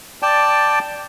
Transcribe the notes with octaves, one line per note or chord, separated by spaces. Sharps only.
D5 G5 A5